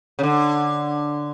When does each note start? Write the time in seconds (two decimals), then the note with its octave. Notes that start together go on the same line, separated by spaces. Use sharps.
0.19 C#3
0.23 D3